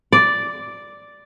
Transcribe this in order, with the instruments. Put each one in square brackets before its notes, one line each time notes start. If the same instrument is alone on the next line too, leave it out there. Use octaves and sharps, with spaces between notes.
[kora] D5